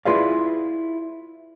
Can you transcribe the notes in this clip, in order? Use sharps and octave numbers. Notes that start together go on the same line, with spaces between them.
E4 F4 G#4 B4 D5 F5